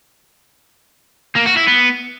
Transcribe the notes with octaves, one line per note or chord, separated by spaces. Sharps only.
A#3
F#4
E4
B3